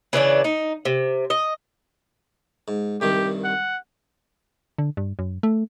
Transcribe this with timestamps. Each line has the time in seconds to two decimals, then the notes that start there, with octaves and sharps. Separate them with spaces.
0.13 C#3 E3 D4 D5
0.44 D#4
0.85 C3
1.30 D#5
2.68 G#2
3.01 C2 G2 D#3 G4
3.44 F#5
4.78 D3
4.97 G2
5.19 F#2
5.43 A3